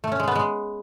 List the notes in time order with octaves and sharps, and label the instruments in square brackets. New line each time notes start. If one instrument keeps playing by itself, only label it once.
[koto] A3
C#4
G#3
B3
G#3